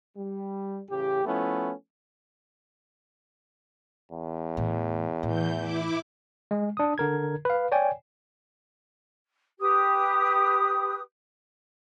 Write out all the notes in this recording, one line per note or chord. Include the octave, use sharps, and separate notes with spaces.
G3
A1 C#3 G4
F3 A3 B3 C#4 E4
E2
A2 E3
A2 E3 G6
E4 D6
G#3
D4 D#6
D3 A#4 G#6
B4 F5
C#5 D5 G5 G#5
G4 B4 D#6